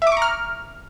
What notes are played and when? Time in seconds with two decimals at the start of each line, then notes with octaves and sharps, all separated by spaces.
0.02 E5
0.07 D6
0.12 C#6
0.17 A#5
0.22 F6